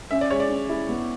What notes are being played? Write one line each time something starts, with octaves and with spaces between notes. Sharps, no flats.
C#4 E5
D5
G#3 C#5
D5
C#4
E4
B3